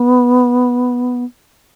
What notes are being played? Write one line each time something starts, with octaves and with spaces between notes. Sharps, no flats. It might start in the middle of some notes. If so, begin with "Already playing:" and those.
Already playing: B3